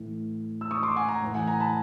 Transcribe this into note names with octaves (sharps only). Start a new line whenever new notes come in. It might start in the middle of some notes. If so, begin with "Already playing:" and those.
Already playing: A2 E3
E6
C#6 D#6
C6 D6
F#5 G#5
G#5 A#5
A2 E3
F#5 G#5
G#5 A#5
A5 B5